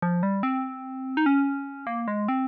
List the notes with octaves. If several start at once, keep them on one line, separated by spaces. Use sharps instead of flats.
F3
G3
C4
D#4
C#4
A#3
G#3
C4